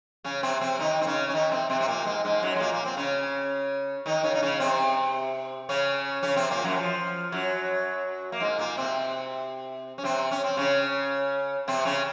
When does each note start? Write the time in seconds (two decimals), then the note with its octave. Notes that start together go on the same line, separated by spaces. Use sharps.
0.24 C#3 C#4
0.43 C3 C4
0.61 C3 C4
0.79 D#3 D#4
1.02 C4
1.06 C#3 C#4
1.29 C#4
1.34 D#3 D#4
1.52 C3 C4
1.70 C3 C4
1.81 C4
1.88 A#2 A#3
2.06 G#2 G#3
2.25 G#2 G#3
2.43 F#2 F#3
2.56 G#3
2.60 A#2 A#3
2.73 A#3
2.85 C4
2.97 C#3 C#4
4.06 D#3 D#4
4.24 C#3 C#4
4.34 D#4
4.43 C#3 C#4
4.60 C3 C4
5.69 C#3 C#4
6.23 C#3 C#4
6.36 C3 C4
6.51 A#2 A#3
6.64 F#2 F#3
6.77 F3
7.32 F#2 F#3
8.32 A#3
8.40 G#2 G#3
8.58 A#2 A#3
8.77 C3 C4
9.98 C#4
10.04 C3 C4
10.31 C#4
10.44 C4
10.57 C#3 C#4
11.68 C3 C4
11.85 C#3 C#4